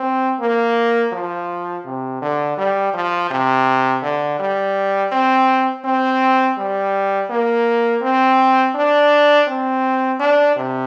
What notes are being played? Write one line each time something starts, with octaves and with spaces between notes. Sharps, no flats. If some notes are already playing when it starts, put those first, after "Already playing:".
Already playing: C4
A#3
F3
C3
D3
G3
F3
C3
D3
G3
C4
C4
G3
A#3
C4
D4
C4
D4
C3